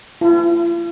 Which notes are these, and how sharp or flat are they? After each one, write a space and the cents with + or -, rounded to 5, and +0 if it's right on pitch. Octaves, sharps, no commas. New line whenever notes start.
F4 -45